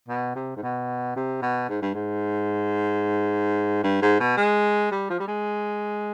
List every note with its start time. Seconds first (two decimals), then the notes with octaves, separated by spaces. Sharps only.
0.08 B2
0.35 C3
0.56 G#2
0.63 B2
1.16 C3
1.42 B2
1.69 G#2
1.82 G2
1.94 G#2
3.84 G2
4.02 G#2
4.20 B2
4.37 G#3
4.91 G3
5.10 F3
5.20 G3
5.28 G#3